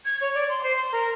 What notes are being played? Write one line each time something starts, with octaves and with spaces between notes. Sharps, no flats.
G#6
C#5
D5
C6
C5
C6
A#4